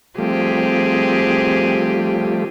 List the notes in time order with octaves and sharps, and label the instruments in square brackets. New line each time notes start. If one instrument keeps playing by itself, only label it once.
[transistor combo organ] F3 G3 A3 [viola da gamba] C4 G4 G#4